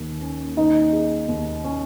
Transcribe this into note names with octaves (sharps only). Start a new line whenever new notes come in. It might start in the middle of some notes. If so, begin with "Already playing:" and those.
Already playing: D#2 D#3
C#4
D#3 D#4
G#4
D#2
C#4